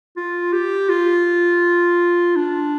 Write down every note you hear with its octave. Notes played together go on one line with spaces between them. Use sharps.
F4
G4
F4
D4